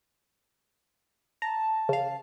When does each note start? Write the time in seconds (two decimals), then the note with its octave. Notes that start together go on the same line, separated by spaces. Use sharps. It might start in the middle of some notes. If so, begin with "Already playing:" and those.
1.42 A5 A#5
1.89 C#3 F5